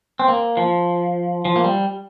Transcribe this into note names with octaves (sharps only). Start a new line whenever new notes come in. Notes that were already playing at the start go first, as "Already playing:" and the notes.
C4
A#3
F3
F3
A#3
G3